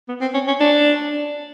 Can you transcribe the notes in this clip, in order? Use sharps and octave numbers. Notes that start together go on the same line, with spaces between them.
B3
C4
C#4
C#4
D4